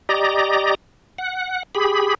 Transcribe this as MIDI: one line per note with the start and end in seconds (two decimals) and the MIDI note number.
0.09 0.75 67
0.09 0.75 74
0.09 0.75 75
0.09 0.75 82
1.18 1.63 78
1.75 2.15 67
1.75 2.15 68
1.75 2.15 83